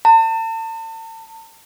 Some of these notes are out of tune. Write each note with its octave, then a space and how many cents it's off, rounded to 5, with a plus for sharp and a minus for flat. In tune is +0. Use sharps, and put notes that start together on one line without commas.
A5 +40